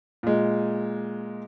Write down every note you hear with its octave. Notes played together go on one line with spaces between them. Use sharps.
A#2 G#3